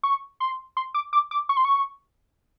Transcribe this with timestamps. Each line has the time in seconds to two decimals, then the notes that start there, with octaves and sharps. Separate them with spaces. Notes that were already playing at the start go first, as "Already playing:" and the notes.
0.03 C#6
0.40 C6
0.77 C6
0.94 D6
1.13 D6
1.31 D6
1.49 C#6
1.57 C6
1.65 C#6